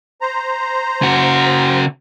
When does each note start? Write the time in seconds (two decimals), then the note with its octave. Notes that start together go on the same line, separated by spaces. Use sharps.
0.21 C5 A#5
1.02 C#3 F#4